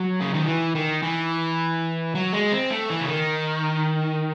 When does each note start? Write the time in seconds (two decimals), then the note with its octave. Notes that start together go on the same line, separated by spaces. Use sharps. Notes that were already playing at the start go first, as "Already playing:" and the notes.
Already playing: F#3
0.21 C#3
0.34 D#3
0.46 E3
0.75 D#3
1.02 E3
2.15 F#3
2.33 G#3
2.52 C4
2.70 A3
2.89 E3
3.00 C#3
3.08 D#3